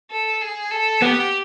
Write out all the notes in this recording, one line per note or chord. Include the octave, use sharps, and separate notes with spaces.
A4
G#4
A4
B3 G4